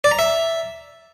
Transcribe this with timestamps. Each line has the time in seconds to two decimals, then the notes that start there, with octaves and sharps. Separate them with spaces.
0.04 D5
0.11 A#5
0.19 E5